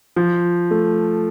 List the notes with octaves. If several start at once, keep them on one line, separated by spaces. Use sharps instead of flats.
F3
A3